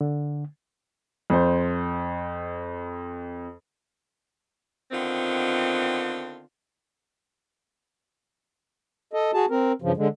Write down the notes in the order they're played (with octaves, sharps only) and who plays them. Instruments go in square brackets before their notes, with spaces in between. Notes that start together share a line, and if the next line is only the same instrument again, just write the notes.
[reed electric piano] D3
[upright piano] F2 C5
[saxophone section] D3 D#3 B3 C4 F4
[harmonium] A4 D#5
F#4 G#4 A5
C4 A#4
G2 C#3 F3
D3 G#3